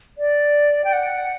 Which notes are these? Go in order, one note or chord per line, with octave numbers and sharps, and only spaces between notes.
D5
G5
F#5